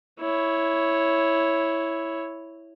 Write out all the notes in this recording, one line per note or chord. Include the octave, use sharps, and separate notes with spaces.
E4 C#5